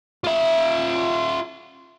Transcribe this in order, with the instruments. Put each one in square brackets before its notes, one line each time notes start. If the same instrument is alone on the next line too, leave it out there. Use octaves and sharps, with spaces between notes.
[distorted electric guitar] F4 E5